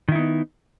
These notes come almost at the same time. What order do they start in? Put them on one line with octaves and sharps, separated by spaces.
D#3 E4 D#4 B3